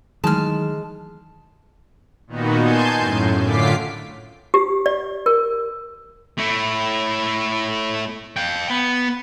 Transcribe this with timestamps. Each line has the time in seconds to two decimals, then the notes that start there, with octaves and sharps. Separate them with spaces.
0.24 D#3 E3 F#3 G#3 A3 A5 F6
2.27 A#2 D#3 B3 D#4 F#4
2.58 G#5 A5 C6 G6
2.98 F#2 A2
3.42 A2 D3 F4 D6 B6 C7
4.54 G4
4.86 D5
5.26 A#4
6.38 A3 E4
8.36 F5 G5
8.69 B3